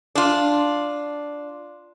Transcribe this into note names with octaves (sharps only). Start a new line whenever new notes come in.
D4 F4